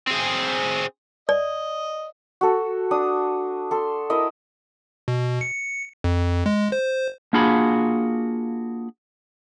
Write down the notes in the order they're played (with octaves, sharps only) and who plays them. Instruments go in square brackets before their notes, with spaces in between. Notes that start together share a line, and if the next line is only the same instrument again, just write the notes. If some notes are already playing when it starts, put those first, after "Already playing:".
[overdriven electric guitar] C4 G#4
[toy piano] D5 [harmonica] D#5
[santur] F#4 A4
D4 D#6
A4 C6
E4 A#4 D#5
[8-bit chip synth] B2
C#7
F2
G#3
C5
[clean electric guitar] A#3 D4 F4 F#4 G#4 B5